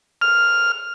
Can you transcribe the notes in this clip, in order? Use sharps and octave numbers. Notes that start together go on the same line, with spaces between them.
F6